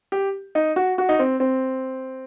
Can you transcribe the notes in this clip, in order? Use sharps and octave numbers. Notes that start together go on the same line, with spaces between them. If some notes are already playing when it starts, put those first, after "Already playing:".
G4
D#4
F#4
F#4
D#4
C4
C4